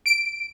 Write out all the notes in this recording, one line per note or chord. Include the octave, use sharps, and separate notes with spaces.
D7